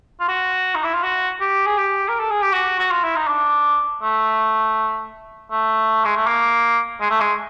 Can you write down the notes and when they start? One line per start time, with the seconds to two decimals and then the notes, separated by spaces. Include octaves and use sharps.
0.20 F4
0.28 F#4
0.75 D#4
0.84 E4
0.94 F4
1.03 F#4
1.40 G4
1.66 G#4
1.78 G4
2.09 A#4
2.20 A4
2.30 G#4
2.42 G4
2.53 F#4
2.79 F#4
2.91 F4
3.04 E4
3.16 D#4
3.27 D4
4.03 A3
5.52 A3
6.05 G#3
6.16 A3
6.27 A#3
7.01 G#3
7.11 A3
7.20 G#3